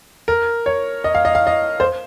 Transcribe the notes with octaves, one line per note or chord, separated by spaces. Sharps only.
A#4
C#5
D#5
F5
D#5
F5
D#5
C5